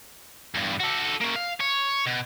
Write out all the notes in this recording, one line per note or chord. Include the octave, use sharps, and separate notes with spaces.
E2 G2
F#4 A4
A#3 C#4
F5
C#5
B2